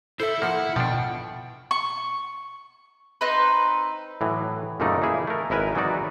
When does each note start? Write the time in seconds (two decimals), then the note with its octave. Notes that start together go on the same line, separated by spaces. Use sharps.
0.20 E4 A4 C5 E5
0.42 F3 A#3 F#5
0.76 B2 F3 D4 G5
1.71 C#6
3.21 C4 D#4 B4
4.21 A2 E3 F#3
4.80 F#2 A#2 C#3 A3 D#4 D5
5.02 E3 A#3 E4 G#4
5.27 A3 A#4
5.50 G#1 E4 A#4 B4 G#5
5.75 E3 F#3 G#3 D#4 F#4 D5